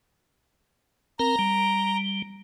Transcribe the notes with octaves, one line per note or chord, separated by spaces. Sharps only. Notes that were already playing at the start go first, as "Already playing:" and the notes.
C4 A#4 A#5
G3